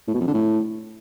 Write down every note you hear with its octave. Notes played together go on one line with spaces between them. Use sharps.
A2
B2
F2
D3
A2